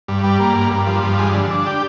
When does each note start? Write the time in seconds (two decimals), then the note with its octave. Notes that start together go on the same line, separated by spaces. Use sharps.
0.08 G2
0.24 G3
0.40 A#3
0.55 G2
0.71 G2
0.87 F3
1.03 G2
1.19 G#3
1.34 D3
1.51 D4
1.66 G4